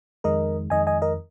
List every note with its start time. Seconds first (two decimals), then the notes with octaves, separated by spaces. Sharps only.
0.24 F2 D#3 G#3 A#4 D#5
0.70 F2 D#3 G#3 D#5 G#5
0.87 D#5 G#5
1.02 A#4 D#5